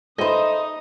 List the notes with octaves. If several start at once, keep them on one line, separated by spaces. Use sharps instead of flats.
D#4 A4 C5 D#5 E5 B5 D#6